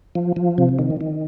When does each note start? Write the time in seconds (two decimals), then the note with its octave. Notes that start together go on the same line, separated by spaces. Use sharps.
0.15 F3
0.36 F3
0.58 C3
0.79 D#3
1.01 D#3